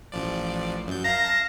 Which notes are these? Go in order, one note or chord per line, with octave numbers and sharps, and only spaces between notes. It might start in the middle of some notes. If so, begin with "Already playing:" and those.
A1 F3 D5
F#2 G6
F5 A5 A#5 G6 A#6
A5